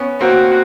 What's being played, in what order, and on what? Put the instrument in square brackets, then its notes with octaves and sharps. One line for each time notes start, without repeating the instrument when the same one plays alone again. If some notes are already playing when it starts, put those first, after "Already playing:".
Already playing: [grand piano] B3 C#4
[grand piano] A#3 C4 [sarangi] F#4